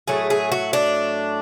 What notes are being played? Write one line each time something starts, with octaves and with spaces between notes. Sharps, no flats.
A2 F#3 A3 G#4
G#4
F#4
D4